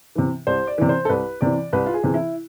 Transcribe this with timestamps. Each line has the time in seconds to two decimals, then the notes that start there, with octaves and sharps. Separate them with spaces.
0.15 C3 E3
0.47 C2 C5
0.67 D5
0.78 C3 E3
0.89 C5
1.05 A4
1.09 C2 B4
1.41 C3 E3 D5
1.73 C2 B4
1.86 F4
1.94 G#4
2.04 C3 E3
2.14 E4